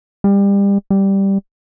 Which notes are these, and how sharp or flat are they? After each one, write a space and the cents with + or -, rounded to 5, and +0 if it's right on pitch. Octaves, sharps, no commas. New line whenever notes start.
G3 +30
G3 +0